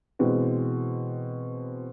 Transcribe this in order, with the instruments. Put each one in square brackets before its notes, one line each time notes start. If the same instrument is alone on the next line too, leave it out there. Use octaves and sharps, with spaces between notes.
[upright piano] B2 E3 G#3 C4